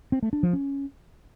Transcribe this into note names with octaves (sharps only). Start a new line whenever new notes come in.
C4
A3
D4
F3
C#4